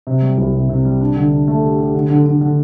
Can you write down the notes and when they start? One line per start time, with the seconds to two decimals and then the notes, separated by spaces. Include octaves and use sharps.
0.07 C3
0.22 G3
0.38 C2
0.53 C3
0.69 C3
0.85 G3
1.01 D4
1.16 D3
1.32 D4
1.48 A3
1.63 G4
1.79 G4
1.95 D3
2.10 D3
2.26 D3
2.41 D3